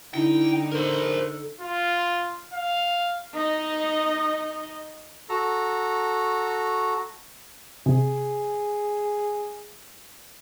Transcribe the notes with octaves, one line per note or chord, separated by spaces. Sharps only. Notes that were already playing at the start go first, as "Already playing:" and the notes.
D3 D#4 E4 G5
A4 A#4 C5
F4
F5
D#4 D#5
F#4 A4 A#5
C3 G#4